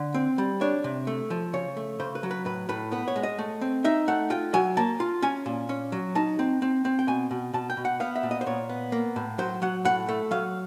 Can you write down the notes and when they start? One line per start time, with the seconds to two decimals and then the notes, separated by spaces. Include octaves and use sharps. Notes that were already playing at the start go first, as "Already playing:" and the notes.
Already playing: D3
0.14 C4
0.38 G3
0.61 D4 C#5
0.84 C3
1.07 A3
1.30 F3
1.53 C#3 C#5
1.77 A3
2.00 C#3 C5
2.15 B4
2.23 F#3
2.31 B4
2.45 A2 B4
2.69 A2 B4
2.92 B3 B4
3.08 C#5
3.16 G#3
3.23 D#5
3.39 A3
3.61 C4
3.84 D#4 E5
4.08 A3 F#5
4.30 F4 G5
4.54 F#3 G#5
4.77 A#3 A5
5.00 F4
5.22 C#4 G#5
5.46 A#2
5.69 C#4
5.92 F#3
6.15 D#4 A5
6.39 C4
6.62 C4
6.85 C4
6.99 G5
7.08 B2 G#5
7.31 B2
7.54 B2 A5
7.70 G5
7.77 B2
7.85 F#5
8.00 B3 F5
8.16 E5
8.23 A#2
8.31 D#5
8.41 C5
8.46 A#2 C#5
8.69 B3
8.92 A#3
9.16 A2
9.38 F#3 C5
9.62 F#3 F#5
9.85 A2 F#5
10.09 A3
10.31 F#3 F5